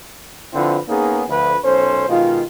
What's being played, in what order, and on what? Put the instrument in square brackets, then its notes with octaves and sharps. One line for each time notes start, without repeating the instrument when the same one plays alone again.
[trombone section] D3 F3 C4 E4 F4 B4
A#3 B3 C#4 D#4 G#4
D2 F3 B4
B1 C#4 A4 C5
B2 D#3 G#3 F4